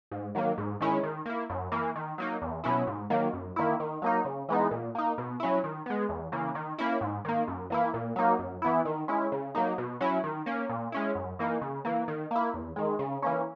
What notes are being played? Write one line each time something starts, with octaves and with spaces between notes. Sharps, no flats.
G#2
D#3 F#3 A#3
G#2
D#3 G#3 C#4 E4
D#3
A#3 E4
F#2
E3 A#3
D#3
F#3 A#3 D#4
E2
B2 F#3 C#4 E4
G#2
D#3 F#3 A#3
F#2
D#3 A#3 E4
D#3
F#3 A#3 D#4
C#3
E3 G#3 B3 D#4
A#2
A#3 D#4
B2
F#3 C#4 E4
D#3
G#3 B3
E2
C#3 E3 A#3
D#3
A#3 C#4 E4
G#2
D#3 A#3
F#2
E3 A#3 E4
A#2
F#3 A#3 D#4
F#2
E3 B3 E4
D#3
G#3 C#4 E4
C#3
F#3 A#3 D#4
B2
F#3 C#4 E4
D#3
A#3 C#4
A#2
G#3 C#4 E4
F#2
E3 A#3 D#4
C#3
E3 A#3
D#3
A#3 E4
E2
D#3 G#3
C#3
E3 A#3 C#4